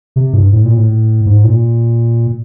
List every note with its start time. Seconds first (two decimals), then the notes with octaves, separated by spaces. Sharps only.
0.16 C3
0.33 G2
0.53 A2
0.65 A#2
0.77 A2
1.26 G#2
1.44 A#2